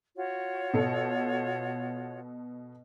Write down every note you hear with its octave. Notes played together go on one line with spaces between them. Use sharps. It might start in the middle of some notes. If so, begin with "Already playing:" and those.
F4 F#4 C#5
B2 A4 C#7